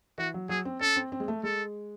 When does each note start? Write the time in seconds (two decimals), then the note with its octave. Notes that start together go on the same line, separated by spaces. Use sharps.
0.18 E3 F#4
0.34 F#3
0.49 F#3 G#4
0.65 C4
0.81 C#4 A4
0.96 C4
1.12 C4
1.20 G#3
1.28 A3
1.43 G#3 A4